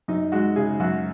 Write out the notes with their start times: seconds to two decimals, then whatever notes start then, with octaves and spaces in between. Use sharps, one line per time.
0.08 F#2 D#4
0.32 G#3 F#4
0.56 C#3 G#4
0.80 F#2 F#4